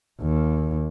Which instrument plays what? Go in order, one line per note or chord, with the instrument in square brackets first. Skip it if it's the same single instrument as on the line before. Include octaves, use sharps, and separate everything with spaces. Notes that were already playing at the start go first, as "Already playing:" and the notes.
[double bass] D#2